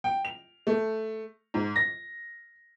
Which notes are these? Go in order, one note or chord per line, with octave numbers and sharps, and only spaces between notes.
G5
F7
A3
G#2
A#6